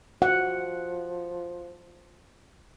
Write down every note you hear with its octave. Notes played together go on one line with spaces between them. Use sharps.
F3 F#5